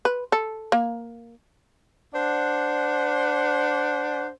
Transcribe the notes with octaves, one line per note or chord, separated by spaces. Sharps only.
B4
A4
A#3
D4 C5 D5 F#5